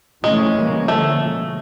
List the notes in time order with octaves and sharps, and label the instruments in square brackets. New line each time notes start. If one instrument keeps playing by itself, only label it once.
[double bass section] C3 E3 A3 C#4 [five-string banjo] G#3
[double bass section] C#3 E3 G3 A#3 C#4
[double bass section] D3 F3 A#3 C#4 [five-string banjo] A3
[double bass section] B2 G#3 C#4